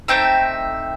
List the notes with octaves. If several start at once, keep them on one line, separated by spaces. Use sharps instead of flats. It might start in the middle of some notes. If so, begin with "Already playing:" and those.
A3 C4 D#4 E5 G5